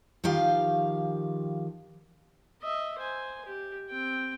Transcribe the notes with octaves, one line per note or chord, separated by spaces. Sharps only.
D#3 F3 G4 F5
D#5 E5
C5 G#5
G4
C4 G5